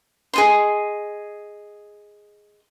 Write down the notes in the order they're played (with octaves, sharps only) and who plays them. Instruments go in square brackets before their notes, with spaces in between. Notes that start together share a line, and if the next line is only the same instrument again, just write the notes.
[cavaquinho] G#4 D#5 C6